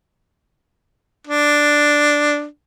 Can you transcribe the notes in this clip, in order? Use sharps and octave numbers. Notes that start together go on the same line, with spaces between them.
D4